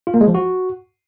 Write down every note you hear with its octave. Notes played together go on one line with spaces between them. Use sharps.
F4
A#3
G#3
F3
F#4